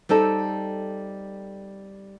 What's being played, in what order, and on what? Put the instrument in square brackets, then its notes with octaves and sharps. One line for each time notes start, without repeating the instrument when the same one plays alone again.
[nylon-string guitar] G3 C4 D#4 A4